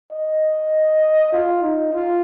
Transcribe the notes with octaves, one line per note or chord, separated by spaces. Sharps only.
D#5
F4
D#4
F4